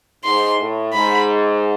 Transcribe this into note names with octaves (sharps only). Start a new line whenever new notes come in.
G#2 C6
A2
G#2 B5